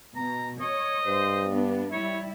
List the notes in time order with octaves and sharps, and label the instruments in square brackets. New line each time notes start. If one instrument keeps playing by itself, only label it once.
[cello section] B2 [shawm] A#5
[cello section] C#5 [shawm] D#5
[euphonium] G2 [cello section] C5
[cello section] B3 D4
[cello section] G3 E4 [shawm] C#5